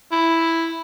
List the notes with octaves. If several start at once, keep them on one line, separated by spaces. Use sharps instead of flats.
E4